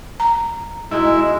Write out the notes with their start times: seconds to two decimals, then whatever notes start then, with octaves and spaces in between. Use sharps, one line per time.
0.20 A#5
0.91 B2 G#3 D#4 E4